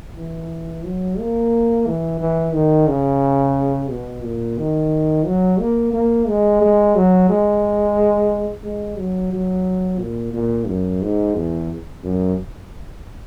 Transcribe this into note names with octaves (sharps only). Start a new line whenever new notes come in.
E3
F#3
A#3
E3
E3
D#3
C#3
B2
A#2
D#3
F#3
A#3
A#3
G#3
G#3
F#3
G#3
G#3
F#3
F#3
A#2
A#2
F#2
G#2
E2
F#2